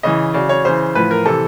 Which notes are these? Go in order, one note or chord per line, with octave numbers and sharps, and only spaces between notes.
C#3 E3 D#5
C#3 F#3 D5
C#5
C#3 E3 C5
A2 F3 B4
A#4
C3 E3 A4